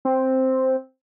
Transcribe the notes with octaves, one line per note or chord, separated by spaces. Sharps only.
C4